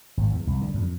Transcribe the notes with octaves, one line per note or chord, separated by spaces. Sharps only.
G#1
E2
C2
D3
F2